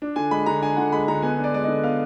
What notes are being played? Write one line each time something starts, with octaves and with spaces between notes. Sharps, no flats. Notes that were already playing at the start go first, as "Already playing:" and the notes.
D4
D3 G#5
G#3 B5
D3 A#5
D4 G#5
D3 F#5
G#3 B5
D3 A#5
B3 G#5
D4
D5
G#3 D5
D3 D#5
B3 F5